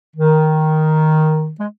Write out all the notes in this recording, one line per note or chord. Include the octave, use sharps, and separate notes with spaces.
D#3
G#3